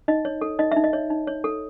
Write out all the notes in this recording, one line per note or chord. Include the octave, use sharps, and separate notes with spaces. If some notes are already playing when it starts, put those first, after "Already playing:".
D#4 D#5
C#5
A4
D#4 D#5
D#4 E5
D#5
C#5
D#4
C#5
A4